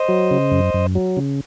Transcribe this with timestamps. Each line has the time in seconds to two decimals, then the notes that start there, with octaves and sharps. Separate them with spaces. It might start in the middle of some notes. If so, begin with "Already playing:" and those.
Already playing: C5 D#5
0.09 F#3
0.31 C#3
0.51 F#2
0.74 F#2
0.95 F#3
1.17 C#3